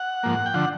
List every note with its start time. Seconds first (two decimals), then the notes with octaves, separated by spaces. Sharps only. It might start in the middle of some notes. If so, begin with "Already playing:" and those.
Already playing: F#5
0.23 G#2 F3 A#3
0.46 G5
0.54 D3 F3 F#5